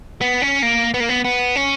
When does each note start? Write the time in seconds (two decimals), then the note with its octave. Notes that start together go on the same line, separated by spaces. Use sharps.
0.21 B3
0.42 C#4
0.62 A#3
0.94 B3
1.00 A#3
1.09 B3
1.25 B3
1.56 C#4